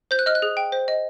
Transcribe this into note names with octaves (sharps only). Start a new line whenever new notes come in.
C5 G6
F#6
D#5 F6
F#6
G#4
G5
C5
D#5